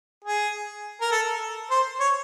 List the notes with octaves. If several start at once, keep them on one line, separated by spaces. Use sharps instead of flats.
G#4
A#4
A4
C5
C#5